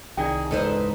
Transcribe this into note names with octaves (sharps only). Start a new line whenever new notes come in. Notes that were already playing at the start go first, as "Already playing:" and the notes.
C2 D#3 G#4 D5 G5
E1 C#2 G#2 D#4 A4 B4 C5